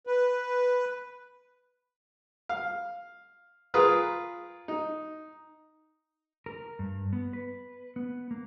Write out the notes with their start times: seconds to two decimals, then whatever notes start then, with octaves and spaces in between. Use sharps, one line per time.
0.07 B4
2.49 F5
3.74 F4 G#4 A#4 B4 D#6 F6
4.68 D#4
6.46 A#4
6.79 G2
7.13 B3
7.33 B4
7.96 B3
8.31 A#3